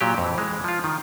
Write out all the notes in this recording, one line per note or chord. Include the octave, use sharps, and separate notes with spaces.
A#2 F#3 G4
F2 E3
E3 G#3
F3 F4
D#3